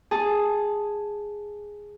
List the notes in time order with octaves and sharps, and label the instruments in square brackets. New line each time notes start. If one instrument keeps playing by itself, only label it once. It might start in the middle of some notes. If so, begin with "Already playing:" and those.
[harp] G#4 A5